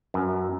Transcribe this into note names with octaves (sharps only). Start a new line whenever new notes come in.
F#2